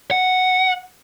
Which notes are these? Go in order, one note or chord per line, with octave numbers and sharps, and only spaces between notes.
F#5